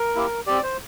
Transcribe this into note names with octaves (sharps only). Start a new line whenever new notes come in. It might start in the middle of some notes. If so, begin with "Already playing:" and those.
Already playing: A#4
A#3 E4 G4
C4 G4 D5
C5